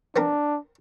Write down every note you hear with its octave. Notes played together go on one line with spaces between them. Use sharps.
B3 C4 D4 A#4